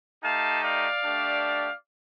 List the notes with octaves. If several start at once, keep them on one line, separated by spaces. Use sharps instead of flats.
A3 D#4 G4 F5 A5
D5 F5
A3 D4 G4